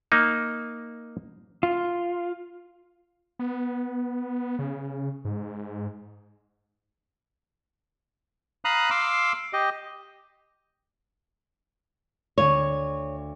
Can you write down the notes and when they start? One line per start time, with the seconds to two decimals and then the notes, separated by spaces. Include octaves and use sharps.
0.12 A#3 D#4
1.63 F4
3.39 B3
4.59 C#3
5.25 G#2
8.65 F5 A#5 B5 D#6 F#6
8.90 F5 C6 D6 E6
9.53 G4 D#5
12.38 D2 C#5 F5 D#7